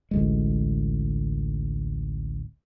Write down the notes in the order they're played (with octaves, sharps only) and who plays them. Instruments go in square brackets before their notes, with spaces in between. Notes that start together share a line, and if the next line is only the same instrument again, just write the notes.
[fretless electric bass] A1 D2 G#3